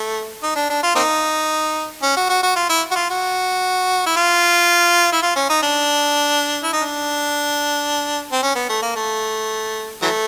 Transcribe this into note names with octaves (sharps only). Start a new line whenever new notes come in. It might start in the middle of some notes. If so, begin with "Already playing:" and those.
Already playing: A3
D#4
D4
D4
F4
A#3 C4 D#4
C#4
F#4
F#4
F#4
F4
E4
F#4
F4
F#4
E4
F4
E4
F4
C#4
D#4
D4
E4
D#4
D4
C4
C#4
B3
A3
A#3
A3
E3 F#3 A3